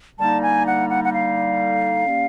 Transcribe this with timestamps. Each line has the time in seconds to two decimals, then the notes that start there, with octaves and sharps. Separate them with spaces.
0.19 D3 G3 A#3 D#4 A5
0.42 G#5
0.67 F#5
0.90 F#5
1.04 F#5
1.13 F5
2.06 G3 A#3 C#4